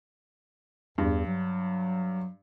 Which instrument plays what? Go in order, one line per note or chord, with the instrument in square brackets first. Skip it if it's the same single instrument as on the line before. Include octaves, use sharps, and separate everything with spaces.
[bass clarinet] E2 [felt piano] G2
[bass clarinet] F#3